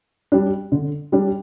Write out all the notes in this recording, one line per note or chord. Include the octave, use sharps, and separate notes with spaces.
G3 D4
D3
G3 D4